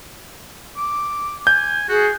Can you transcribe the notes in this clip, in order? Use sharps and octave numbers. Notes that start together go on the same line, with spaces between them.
D6
G#5 G6
F#4 G#4